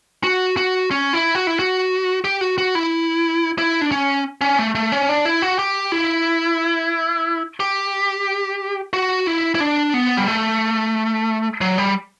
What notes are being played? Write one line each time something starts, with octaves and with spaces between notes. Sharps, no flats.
F#4
F#4
C#4
E4
F#4
E4
F#4
G4
F#4
F#4
E4
E4
D4
C#4
C#4
A3
A3
C#4
D4
E4
F#4
G4
E4
G4
F#4
E4
E4
D4
B3
G3
A3
F#3
G3